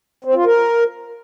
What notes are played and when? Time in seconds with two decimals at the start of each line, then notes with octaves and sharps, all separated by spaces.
0.24 C4
0.35 F4
0.45 A#4